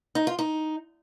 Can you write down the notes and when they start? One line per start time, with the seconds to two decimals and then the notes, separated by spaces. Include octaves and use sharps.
0.15 D#4
0.27 F4
0.39 D#4